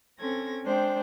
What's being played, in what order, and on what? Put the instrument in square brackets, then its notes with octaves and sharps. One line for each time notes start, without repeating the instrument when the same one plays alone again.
[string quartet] C4 C#4 A4 G#6 A#6
G#3 D4 C5 G5